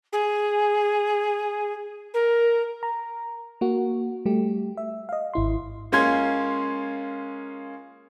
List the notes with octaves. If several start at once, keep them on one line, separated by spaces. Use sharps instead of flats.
G#4
A#4
A#5
A#3 F#4
G3 A3 G4
E5
D#5 F5
G#1 E4 C6
G#3 A#3 C#4 F4 C6 G#6